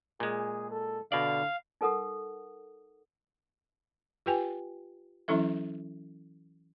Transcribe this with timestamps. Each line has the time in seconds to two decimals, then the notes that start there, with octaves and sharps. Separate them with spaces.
0.20 A#2 G#3 G#4
0.71 A4
1.12 B2 D3 D5 F5
1.81 D#4 A4 A#4 F#5 D#6
4.26 F4 G4 B4 G5 G#5
5.28 E3 F#3 C#4 E4 A4 E5